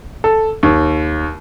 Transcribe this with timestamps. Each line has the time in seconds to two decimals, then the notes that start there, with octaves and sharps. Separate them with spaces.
0.24 A4
0.63 D#2